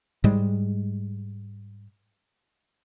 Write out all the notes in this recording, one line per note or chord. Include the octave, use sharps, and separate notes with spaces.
G#2 G3 G#3